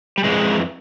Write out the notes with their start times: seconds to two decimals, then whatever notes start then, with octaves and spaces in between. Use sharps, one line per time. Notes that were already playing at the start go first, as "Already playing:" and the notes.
0.18 G3
0.24 F2 C#3 E3 G#3